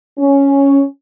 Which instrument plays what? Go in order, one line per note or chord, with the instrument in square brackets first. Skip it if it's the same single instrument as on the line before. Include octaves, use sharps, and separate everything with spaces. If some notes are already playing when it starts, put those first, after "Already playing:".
[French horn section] C#4